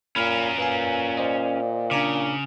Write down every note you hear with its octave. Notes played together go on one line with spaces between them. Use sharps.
A#2 C#4 A#4 B5 F6
A#2 B4 F5 G#5
C5 D5 D#5
C#3 D4 A#5 D6